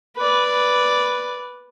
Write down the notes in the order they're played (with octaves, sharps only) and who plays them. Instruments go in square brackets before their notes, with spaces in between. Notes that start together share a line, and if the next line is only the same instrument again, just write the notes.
[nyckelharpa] B4 D5